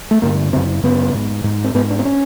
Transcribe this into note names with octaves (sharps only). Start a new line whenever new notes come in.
A3
G2 D3 A#3
F#2 C#3 C4
F#2 C#3 B3
G#2
G#2
C4
G#2 B3
D4
C4
C#4